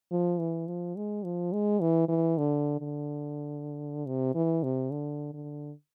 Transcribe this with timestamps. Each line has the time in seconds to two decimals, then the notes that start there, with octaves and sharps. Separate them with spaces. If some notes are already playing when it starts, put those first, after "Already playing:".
0.11 F3
0.39 E3
0.67 F3
0.96 G#3
1.24 F3
1.53 G#3
1.81 E3
2.08 E3
2.38 D3
2.80 D3
4.06 C3
4.35 E3
4.63 C3
4.91 D3
5.33 D3